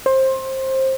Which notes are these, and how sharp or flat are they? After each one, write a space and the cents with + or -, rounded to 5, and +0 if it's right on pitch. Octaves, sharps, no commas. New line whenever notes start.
C5 +20